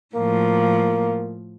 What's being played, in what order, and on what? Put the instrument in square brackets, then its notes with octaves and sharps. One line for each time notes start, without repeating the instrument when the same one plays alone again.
[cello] A2 F3 [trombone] A#3